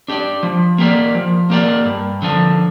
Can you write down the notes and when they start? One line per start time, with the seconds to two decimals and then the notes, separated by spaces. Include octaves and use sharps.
0.08 D4 G4 D5
0.43 F3
0.78 A#3 G4 A#4 D5
1.15 F3
1.50 A#3 G4 A#4 D5
1.85 G2
2.22 D3 F3 D4